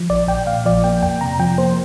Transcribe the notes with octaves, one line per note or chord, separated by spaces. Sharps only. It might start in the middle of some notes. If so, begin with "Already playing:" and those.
Already playing: F3
A#1 D5
A#1 G5
A#2 F5
F3 D5
A#3 G5
F2 G5
C3 A#5
F3 G5
A#3 C5